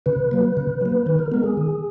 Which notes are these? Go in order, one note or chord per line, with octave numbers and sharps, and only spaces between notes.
C#3 B4
F#3 A#3
C#3
F#3 A#3
D#3 B4
A#4
G#3 B3 A#4
G#4
D#3